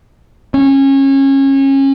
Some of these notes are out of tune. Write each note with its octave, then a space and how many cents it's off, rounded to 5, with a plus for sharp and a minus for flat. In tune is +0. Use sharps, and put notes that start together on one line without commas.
C#4 -25